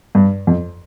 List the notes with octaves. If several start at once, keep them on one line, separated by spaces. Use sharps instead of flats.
G2
F2